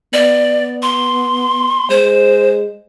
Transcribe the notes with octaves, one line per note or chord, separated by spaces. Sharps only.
B3 D5
C6
G#3 C5